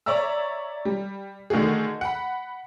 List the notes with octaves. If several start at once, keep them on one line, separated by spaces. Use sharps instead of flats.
C#5 D5 E5 A#5 E6
G3
D3 D#3 A3 F#4 G#4
F#5 B5